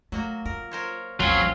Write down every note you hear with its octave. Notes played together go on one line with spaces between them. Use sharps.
F#3 A3 A#3 F#4
F4 A#4
A#4 C5 C#5
A1 D#2 F#3 C4 C#4 F4